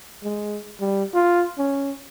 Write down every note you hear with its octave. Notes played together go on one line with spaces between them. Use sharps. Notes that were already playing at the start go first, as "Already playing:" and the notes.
G#3
G3
F4
C#4